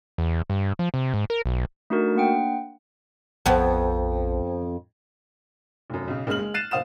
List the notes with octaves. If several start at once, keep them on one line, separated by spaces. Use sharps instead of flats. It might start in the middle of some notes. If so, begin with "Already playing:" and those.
E2
G2
F3
C3
G#2
A#4
B1
A3 D4 D#4 F#4 A#4
A#3 D4 F#5 G5
A#1 F2 B3 C5 G5 A5
F1 F#2
B1 C#3
F#1 C#3 G#3 F6 F#7
G#3
F#6 A6 C7 D#7 E7
F#1 C5 F5 D#6 E7